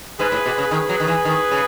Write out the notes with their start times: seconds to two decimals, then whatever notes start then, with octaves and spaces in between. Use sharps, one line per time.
0.19 G#2 G#4 B4
0.32 A2
0.46 B2
0.58 C#3
0.71 D#3 G#4 B4
0.89 F#3
1.00 D#3
1.07 E3
1.25 D#3
1.51 C#3